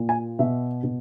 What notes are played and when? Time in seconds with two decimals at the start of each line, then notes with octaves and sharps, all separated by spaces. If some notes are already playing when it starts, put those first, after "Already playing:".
Already playing: A#2
0.09 G#5
0.39 B2 E5
0.83 B2